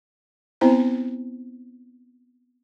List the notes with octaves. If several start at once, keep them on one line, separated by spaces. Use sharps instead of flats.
B3 C4 E4 C5 A#5